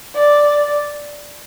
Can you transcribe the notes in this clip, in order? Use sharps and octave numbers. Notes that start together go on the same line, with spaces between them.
D5